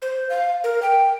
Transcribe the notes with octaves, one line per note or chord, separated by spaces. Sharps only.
C5
F5
A#4
G5